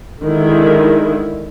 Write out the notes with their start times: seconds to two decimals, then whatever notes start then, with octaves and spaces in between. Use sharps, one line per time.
0.22 D3 D#3 G#3 E4